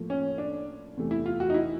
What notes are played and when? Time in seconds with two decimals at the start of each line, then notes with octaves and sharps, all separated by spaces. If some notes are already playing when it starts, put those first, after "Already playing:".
Already playing: A2 F3 A#3
0.10 C#4
0.38 D4
0.97 E2 C3 E3 A3
1.11 E4
1.26 F4
1.40 F#4
1.50 D#4
1.54 E4